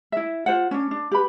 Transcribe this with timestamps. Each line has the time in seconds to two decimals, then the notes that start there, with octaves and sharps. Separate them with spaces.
0.12 E4 E5
0.46 F4 C5 F#5
0.71 C#4 D4
0.91 D4
1.11 G4 B4 B5